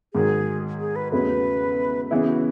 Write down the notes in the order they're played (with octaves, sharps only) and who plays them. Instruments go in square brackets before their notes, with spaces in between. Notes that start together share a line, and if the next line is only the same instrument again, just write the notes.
[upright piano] G#2 D#3 F#3 [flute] G#4
[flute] G#4
B4
[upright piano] E2 C#3 F#3 A3 [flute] B4
[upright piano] C#3 E3 B3 E4 [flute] G#4
[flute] F#4